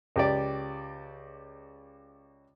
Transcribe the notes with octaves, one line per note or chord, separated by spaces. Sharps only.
C#2 G4 D5